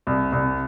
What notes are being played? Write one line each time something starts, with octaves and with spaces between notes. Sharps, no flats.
C2
C2